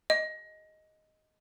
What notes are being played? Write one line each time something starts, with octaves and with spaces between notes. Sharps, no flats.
D#5